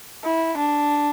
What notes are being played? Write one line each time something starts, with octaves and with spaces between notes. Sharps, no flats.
E4
D4